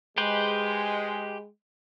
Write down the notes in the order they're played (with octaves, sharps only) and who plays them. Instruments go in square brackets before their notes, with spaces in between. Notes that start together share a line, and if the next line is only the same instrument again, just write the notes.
[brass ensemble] G#3 [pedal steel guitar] G4 B4 C5